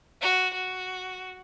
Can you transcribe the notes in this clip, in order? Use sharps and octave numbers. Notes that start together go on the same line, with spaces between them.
F#4
F#4